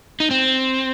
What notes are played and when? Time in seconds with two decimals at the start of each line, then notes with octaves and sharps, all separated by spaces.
0.20 D#4
0.31 C4